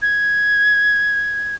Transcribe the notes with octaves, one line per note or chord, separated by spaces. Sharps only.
G#6